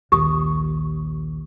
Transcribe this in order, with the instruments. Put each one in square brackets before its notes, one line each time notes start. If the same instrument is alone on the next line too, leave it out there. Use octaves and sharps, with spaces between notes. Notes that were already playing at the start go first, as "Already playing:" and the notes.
[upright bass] A#1 D#2 [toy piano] G4 C#6 D#6